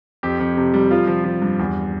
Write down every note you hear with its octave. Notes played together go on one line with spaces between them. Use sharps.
F2 G4
F2
C3
G3
F3 F4
F3
F3
G2
E2